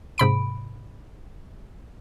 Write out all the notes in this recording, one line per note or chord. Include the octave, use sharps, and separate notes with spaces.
G#2 C3 B5 D7